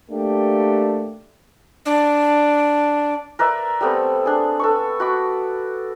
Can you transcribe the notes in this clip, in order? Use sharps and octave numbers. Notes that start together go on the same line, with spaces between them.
A3 A#3 D4 G4
D4
A#4 B4 D5 E5
G3 A3 B3 C4
D4 G#4
A4 B4 C#6
F#4 B5 D6